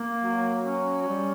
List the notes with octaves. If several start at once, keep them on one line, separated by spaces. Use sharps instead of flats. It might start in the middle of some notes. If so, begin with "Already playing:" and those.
Already playing: A#3
F#3
C#4
G3